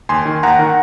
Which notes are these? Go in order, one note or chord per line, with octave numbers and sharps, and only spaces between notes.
D#2 G#5 C6
D#3
D#2 F#5 A#5
D#3